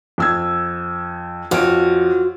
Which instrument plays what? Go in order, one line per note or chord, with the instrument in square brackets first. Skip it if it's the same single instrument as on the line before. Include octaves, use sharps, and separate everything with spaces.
[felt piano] F2 E6 G#6
[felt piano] F2 D7 [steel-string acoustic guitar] F4 F#4 C#5